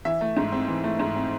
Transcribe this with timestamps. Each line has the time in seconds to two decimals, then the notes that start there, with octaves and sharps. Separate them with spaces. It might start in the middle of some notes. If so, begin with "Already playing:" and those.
0.05 E3 E5
0.21 A3
0.37 G#2
0.52 C4
0.68 E3
0.84 A3
0.99 G#2
1.15 C4